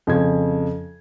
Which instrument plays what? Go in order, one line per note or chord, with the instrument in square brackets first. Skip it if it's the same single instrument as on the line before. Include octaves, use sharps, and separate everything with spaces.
[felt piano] F2 C#3 G#6